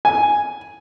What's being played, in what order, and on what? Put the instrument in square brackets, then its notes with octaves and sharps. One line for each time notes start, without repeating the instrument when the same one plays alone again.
[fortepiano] G#5